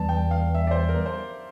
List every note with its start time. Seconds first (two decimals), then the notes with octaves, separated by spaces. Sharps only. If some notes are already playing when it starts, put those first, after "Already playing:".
Already playing: E2 E3 G3 A5
0.09 G5
0.31 F5
0.55 E5
0.67 D5
0.71 C5
0.89 A#4
1.06 C5